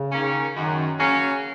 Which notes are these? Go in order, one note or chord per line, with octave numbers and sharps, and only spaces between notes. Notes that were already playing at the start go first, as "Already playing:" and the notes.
Already playing: C#3
D#3 A#3 C#4
F#2 D#3
C#3 F#3 A#3 C#4